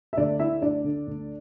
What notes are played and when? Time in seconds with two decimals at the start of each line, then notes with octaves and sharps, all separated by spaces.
0.13 E5
0.17 D2 D4 D5
0.39 D3 E4 E5
0.62 D2 D4 D5
0.84 D3
1.07 D2